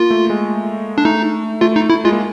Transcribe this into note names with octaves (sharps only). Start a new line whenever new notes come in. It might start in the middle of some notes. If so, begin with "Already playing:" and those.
Already playing: A#3 F4
A3
G#3
D4
A3 D#4
A3 F4
D#4
A3 E4
G#3 F4
A#3